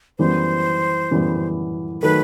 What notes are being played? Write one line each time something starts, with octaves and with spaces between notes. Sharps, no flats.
F#2 E3 G3 B3 C5
F#2 E3 G3 B3
D#3 F#3 A3 B4